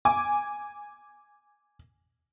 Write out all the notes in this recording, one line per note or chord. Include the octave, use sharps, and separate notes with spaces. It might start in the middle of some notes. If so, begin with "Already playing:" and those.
G#5 D6